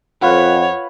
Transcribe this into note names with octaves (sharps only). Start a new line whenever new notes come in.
F2 F4 B4 C#5 F5 F#5